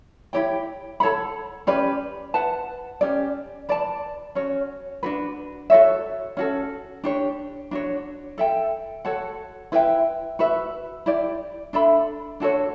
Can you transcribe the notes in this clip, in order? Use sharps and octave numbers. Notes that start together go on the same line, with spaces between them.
E4 G4 C#5 G5
A4 C#5 F#5 B5
C#4 G4 B4 D5
B4 F#5 A5
C#4 G4 D5
B4 D5 A5
C#4 F#4 C#5
D4 F#4 B4
F#4 A4 C#5 E5
C#4 F#4 A4
D4 G4 C#5
D4 F#4 C#5
A4 E5 G5
F#4 A4 C#5 F#5
E4 B4 E5 G5
F#4 B4 E5
E4 G4 D5
D4 A4 E5 B5
D4 F#4 A4 C#5